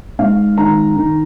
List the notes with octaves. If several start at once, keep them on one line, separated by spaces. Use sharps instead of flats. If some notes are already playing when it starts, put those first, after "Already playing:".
G#2 F5
D#3 A#5
D#3